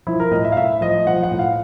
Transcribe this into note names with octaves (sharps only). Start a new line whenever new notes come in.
F3 E4
A#4
A2 D#5
E5
F5
A2 E5
F3 D#5
F3 F#5
F#5
A2
F5